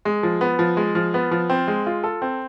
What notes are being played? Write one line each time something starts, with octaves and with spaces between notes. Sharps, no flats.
G#3
F3
B3
F3
G#3
F3
B3
F3
C4
G#3
F4
A4
C4